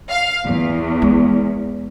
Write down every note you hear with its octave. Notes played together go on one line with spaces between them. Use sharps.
F5
E2
G#3